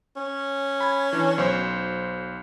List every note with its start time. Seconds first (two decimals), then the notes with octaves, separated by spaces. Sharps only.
0.16 C#4
0.80 B5 G#6
1.13 E3 D4
1.38 B1 C5